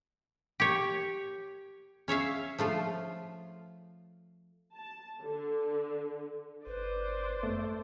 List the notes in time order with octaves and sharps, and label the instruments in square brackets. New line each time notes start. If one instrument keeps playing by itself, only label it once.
[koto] G4 C#5
C#4 C#5 E5 F5
F3 A3 F4
[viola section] A5
D3
[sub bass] G1 [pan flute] B4 [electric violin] C5 D5
[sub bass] F#2 [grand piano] A3